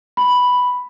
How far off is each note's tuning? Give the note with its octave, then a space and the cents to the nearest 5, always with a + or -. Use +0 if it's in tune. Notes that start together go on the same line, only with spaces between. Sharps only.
B5 +0